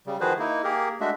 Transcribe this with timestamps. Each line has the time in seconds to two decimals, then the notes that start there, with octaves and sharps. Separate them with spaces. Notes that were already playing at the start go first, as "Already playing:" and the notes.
0.07 C#3 G3
0.21 D#3 F3 F#4 G#4 B4 C5
0.39 A#3 D#4 E4
0.64 A#3 G4 G#4 A#4
1.01 G#3 A3 D4 F#4 E5